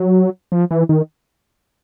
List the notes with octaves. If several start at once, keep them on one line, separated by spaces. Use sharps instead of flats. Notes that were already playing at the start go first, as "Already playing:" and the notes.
Already playing: F#3
F3
E3
D#3